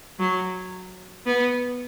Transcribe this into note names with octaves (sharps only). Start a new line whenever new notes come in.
F#3
B3